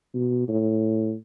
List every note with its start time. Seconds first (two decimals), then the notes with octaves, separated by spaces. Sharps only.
0.14 B2
0.49 A2